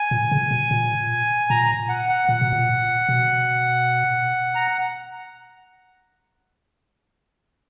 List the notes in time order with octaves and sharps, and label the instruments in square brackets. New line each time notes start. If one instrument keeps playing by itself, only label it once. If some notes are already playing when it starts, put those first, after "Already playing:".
Already playing: [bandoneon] G#5
[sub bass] A#2
C#3
B2
A#2
[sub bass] A#2 [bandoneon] A#5
[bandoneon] F#5
F#5
[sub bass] A#2 [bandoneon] F#5
[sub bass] B2
A#2
B2
[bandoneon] A#5